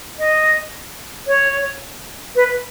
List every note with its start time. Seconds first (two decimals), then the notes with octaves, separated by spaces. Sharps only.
0.18 D#5
1.27 C#5
2.35 B4